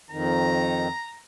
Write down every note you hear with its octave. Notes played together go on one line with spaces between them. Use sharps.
F2 D#3 A#5